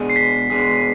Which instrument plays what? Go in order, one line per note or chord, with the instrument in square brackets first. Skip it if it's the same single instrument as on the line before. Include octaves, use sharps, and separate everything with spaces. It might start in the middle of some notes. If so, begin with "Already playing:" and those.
Already playing: [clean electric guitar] B2 G#3 D4 G#4
[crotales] C7
B6
[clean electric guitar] B2 G#3 D4 G#4